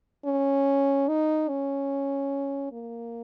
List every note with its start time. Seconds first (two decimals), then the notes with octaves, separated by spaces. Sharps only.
0.25 C#4
1.08 D#4
1.48 C#4
2.72 A#3